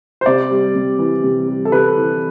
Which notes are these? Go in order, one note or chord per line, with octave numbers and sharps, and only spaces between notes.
C5
C3 D5
G3
C3
E3
C3
G3
A4
C3 B4
E3